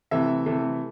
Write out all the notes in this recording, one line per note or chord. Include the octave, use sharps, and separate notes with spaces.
C3 E3 A3 E5
C3 E3 A3